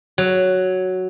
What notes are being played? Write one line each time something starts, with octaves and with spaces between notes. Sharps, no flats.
F#3